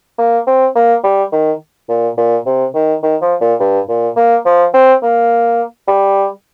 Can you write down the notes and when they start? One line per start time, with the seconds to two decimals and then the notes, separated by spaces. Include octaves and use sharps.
0.18 A#3
0.47 C4
0.75 A#3
1.04 G3
1.32 D#3
1.89 A#2
2.18 A#2
2.46 C3
2.75 D#3
3.03 D#3
3.22 F3
3.41 A#2
3.60 G2
3.89 A#2
4.17 A#3
4.46 F3
4.74 C4
5.03 A#3
5.88 G3